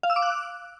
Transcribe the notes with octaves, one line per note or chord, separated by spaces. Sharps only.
F5
E6
D6
F#6